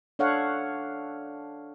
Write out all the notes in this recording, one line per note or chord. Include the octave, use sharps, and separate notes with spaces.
D4 A4 C#5 F5 F#5